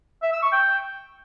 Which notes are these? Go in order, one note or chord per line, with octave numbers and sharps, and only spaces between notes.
E5
E6
C#6
G5